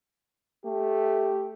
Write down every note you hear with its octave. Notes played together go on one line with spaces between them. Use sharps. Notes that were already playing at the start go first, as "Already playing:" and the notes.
A3 G4